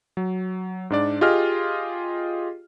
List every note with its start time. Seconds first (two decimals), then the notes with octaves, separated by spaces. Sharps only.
0.17 F#3
0.90 G#2 D4 D5
1.21 F4 G4 G#4 D#5 F6